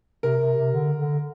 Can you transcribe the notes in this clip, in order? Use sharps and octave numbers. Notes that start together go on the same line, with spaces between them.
C3 A#4
C3
C3
D3
D3